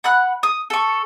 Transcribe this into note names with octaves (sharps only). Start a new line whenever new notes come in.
F#5 B5 F#6
D#6
A4 C#6